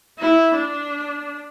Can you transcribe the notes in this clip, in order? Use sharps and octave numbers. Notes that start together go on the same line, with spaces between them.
E4
D4